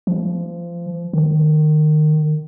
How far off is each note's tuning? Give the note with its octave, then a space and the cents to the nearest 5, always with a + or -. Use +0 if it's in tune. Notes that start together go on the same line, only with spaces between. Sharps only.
F3 -25
D#3 -25